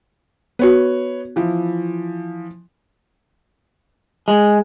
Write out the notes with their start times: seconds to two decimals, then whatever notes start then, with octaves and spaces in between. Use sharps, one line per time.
0.59 B3 F#4 B4 C#5
1.36 E3 F3 E4
4.28 G#3